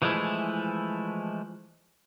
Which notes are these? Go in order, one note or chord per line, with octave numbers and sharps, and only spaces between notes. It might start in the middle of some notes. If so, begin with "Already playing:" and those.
E3 F3 G#3 A3 E4